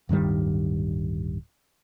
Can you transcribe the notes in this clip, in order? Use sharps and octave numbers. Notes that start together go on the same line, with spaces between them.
D1 G2 D#3 G3